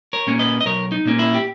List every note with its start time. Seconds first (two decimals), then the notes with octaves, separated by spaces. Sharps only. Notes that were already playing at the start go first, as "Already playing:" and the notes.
0.13 A#4 C#5
0.27 A#2 A#3 C#4
0.39 B4 D#5
0.61 D#5
0.65 B1 A#4 C#5
0.92 D#4
1.05 A#2 A#3 C#4
1.19 E4
1.34 G4